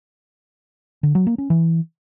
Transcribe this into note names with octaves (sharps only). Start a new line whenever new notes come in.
D3
F#3
A#3
C#4
E3